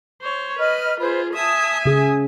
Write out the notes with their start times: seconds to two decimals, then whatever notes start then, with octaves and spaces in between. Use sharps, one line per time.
0.22 C5 C#5
0.58 B4 D#5 F6
1.00 F4 G#4 B4 C5
1.34 E5 G#5 A5 D#6
1.86 C#3 G#4 D#6